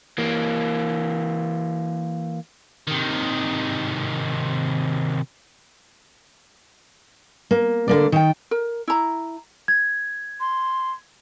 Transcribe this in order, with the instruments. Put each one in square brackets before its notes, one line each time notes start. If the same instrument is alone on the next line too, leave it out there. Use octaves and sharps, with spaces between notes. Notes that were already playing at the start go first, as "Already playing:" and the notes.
[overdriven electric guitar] E3 A#3
[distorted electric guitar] C3 D#3
[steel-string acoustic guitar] A#3
D3 A#3 D5
D#3 G5
[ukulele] A#4
E4 A#5
[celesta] G#6
[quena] C6